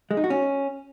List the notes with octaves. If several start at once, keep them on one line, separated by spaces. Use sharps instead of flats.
G#3
D#4
F#4
C#4